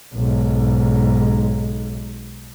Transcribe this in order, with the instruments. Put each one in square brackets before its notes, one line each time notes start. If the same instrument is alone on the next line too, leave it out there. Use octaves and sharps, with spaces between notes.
[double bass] B1 G#2